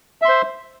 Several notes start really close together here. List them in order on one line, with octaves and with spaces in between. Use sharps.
E5 C6 C5